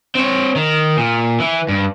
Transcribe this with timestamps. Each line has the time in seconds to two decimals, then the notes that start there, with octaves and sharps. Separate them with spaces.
0.15 C4 C#5
0.56 D#3
0.97 A#2
1.40 E3
1.69 G2